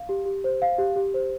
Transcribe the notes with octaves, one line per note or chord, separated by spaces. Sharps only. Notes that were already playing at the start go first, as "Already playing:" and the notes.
Already playing: F5
G4
G4
C5
F5
G4
G4
C5